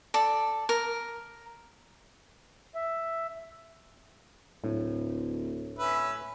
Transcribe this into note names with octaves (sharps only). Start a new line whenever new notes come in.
A4 D5
A#4
E5
D1 A2
C#4 B4 E5